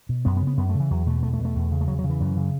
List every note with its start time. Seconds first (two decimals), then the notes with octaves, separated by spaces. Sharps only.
0.09 B2
0.25 F#2 B3
0.37 B3
0.41 C#3
0.47 B3
0.57 F#2 B3
0.69 A3
0.75 C#3
0.80 E3
0.91 E2 F#3
1.06 B2 A3
1.23 E2 A3
1.33 A3
1.39 B2
1.45 A3
1.55 E2
1.72 C#3
1.81 A3
1.88 E2 F#3
1.99 F#3
2.04 C#3
2.10 E3
2.20 F#2
2.37 C#3